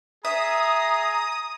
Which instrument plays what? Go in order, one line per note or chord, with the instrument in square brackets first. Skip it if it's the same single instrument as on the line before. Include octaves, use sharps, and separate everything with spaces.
[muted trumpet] G#4 [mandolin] E5 [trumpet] A#5 [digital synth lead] D#6